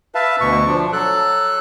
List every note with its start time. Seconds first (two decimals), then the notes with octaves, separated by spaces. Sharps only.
0.15 B4 E5 F5 A5
0.41 D2 B2 C#6
0.66 F3 D4
0.93 F#3 A4 F#6